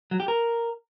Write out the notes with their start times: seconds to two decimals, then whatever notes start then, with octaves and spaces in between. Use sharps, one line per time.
0.11 F#3
0.20 G4
0.28 A#4